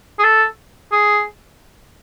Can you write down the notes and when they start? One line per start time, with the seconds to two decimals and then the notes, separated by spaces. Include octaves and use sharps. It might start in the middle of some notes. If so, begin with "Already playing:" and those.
0.19 G#4
0.24 A4
0.92 G#4